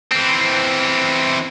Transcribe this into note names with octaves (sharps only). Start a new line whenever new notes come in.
E3 C4